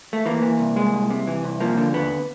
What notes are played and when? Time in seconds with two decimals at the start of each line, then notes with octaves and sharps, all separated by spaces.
0.13 A3
0.26 E3 A#3
0.42 E3
0.59 C2
0.76 G#3
0.93 C2
1.10 C3
1.27 E3
1.44 C2
1.60 F3 A#3
1.77 D3
1.94 D#2 B3